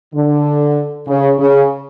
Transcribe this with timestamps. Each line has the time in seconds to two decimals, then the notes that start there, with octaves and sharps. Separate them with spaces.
0.15 D3
1.07 C#3
1.39 C#3